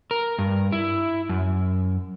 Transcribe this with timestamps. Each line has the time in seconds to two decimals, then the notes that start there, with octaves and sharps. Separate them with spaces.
0.11 A#4
0.39 G2
0.72 E4
1.29 F#2